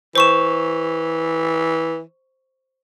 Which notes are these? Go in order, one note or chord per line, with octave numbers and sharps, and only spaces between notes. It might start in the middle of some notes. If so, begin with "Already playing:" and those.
E3 C5 C#6 E7